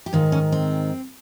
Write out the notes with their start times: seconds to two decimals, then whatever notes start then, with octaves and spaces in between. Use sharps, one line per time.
0.06 G4
0.13 G#2 D#3 F4
0.32 C#4
0.52 C4